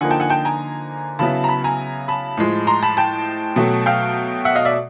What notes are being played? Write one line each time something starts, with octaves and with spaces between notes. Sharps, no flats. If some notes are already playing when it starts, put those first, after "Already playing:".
D3 F3 A#3 D#4 F#5 G#5
G5 A5
F#5 G#5
G5 A5
G#5 A#5
C#3 F#3 B3 E4 A5 B5
A#5
A5 B5
G#5 A#5
A5 B5
A2 F3 G#3
A#5 C6
A5 B5
G5 A5
B2 F#3 A3
F5 G5
E5 F#5
D#5 F5
D5 E5